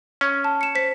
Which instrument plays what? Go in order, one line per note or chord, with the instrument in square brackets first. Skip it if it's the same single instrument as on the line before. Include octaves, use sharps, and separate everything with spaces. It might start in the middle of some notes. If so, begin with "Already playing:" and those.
[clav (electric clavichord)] C#4
[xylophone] A5
C#7 E7
C5 B6